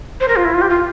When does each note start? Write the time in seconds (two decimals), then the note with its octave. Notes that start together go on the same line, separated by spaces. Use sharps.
0.20 C5
0.28 A#4
0.36 F4
0.45 E4
0.54 F4
0.61 G4
0.69 F4